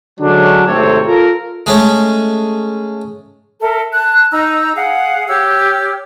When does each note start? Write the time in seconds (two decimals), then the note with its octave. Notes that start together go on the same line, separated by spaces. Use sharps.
0.20 D3 F#3 G#3 C#4 D4
0.67 G#1 C3 A3 C4 A4 C#5
1.06 F4 A4 A#4
1.66 G#3 A3 C#4
3.61 A4 A#4 E5
3.93 A5 F#6
4.32 D#4 A#5 E6
4.76 G#4 F5 F#5
5.28 G4 C#5 E6 F6